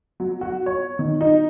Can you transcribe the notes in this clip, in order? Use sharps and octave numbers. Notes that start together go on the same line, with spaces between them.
F#3
F#4
C#5
D#3
D#4